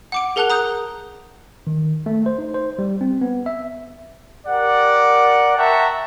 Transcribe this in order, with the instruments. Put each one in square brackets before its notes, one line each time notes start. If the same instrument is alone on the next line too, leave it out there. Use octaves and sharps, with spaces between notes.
[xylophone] F#5 D6 D7
G#4 A#4 F#5 A5 F#6 F7
A#5 D#6 F#6 G6
[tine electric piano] D#3
A3
C5
D#4
C5
G3
C4
B3
E5
[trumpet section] G4 A#4 D5 F#5
E5 F#5 G5 A5 A#5 C#6